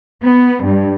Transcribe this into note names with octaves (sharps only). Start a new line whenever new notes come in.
B3
G2